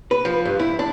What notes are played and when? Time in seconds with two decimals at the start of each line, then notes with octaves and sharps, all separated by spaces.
0.11 B4
0.25 F3
0.45 G2
0.59 E4
0.79 D4